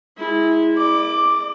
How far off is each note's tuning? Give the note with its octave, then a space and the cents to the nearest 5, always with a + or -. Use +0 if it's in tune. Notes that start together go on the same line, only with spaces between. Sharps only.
G#3 +0 E4 -15
D5 +35 D6 +0